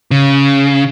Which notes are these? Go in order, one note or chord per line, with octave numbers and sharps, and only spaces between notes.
C#3